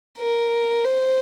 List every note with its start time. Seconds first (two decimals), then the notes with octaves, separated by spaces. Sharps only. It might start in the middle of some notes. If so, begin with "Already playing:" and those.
0.18 A#4
0.84 C5